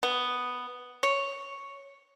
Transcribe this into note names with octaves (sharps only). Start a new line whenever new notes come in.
B3
C#5